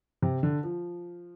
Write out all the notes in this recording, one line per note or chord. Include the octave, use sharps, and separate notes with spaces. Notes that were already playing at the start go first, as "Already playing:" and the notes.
C3
D3
F3